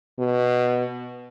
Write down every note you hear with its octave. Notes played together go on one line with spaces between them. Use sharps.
B2